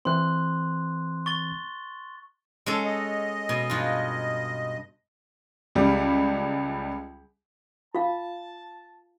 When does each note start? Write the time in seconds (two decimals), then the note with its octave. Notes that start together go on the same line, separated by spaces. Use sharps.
0.05 E3 C4 C6 F#6
1.26 C#6 A6 G7
2.66 G#3 C#4 A4
2.85 D#5
3.49 B2
3.70 G2 F4
5.75 C#2 G3
7.95 F4 F5 A5